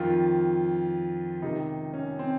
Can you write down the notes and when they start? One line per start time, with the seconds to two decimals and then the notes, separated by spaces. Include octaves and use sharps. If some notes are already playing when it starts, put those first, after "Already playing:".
Already playing: F2 D#3 F4
1.42 C#2 C3 D#3 D#4
1.94 C#4
2.19 C4